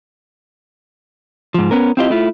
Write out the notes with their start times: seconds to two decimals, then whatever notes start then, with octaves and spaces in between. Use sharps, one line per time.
1.54 G#2 F3
1.71 B3 C#4 A#4
1.97 C4 E4 F4 G4 D#5
2.10 A3 E4 F4